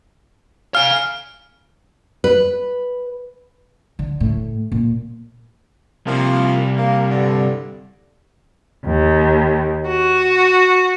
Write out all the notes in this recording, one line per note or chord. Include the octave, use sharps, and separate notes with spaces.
F5 G#5 F6
B4
D3
A2
A#2
C3 F3 G3 A#3
A#3
G2 D3
D#2
F#4